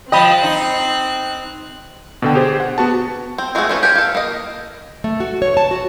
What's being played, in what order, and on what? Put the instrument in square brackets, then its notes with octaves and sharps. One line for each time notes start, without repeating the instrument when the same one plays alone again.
[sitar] F3 D#5 [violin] C4 F#6 [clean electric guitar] G5 B5
[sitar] D#4
[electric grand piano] B2 D3 G5
G4 G#4 C5
F#5
B3 F#4 A5
[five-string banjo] C4
G#3 A3 C4 F#4 G#4
A3 C#4 D4 B4
G4 A#4 G#5
A4 F5
A#3 D#5
[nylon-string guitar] A3
F#4
C#5
A5
F#4